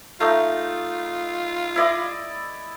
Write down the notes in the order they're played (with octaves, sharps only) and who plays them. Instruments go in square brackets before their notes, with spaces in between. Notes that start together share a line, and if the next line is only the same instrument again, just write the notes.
[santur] A3 D#4 [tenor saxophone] F4
[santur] E4 D5 D#5